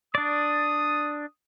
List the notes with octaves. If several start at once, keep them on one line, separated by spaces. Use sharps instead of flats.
D4 D5 D#6